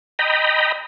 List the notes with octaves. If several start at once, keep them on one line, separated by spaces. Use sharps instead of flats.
D#5 G5 A#5 B5